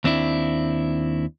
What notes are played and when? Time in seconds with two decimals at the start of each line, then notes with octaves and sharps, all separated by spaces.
0.04 D#2 C4 D4 E4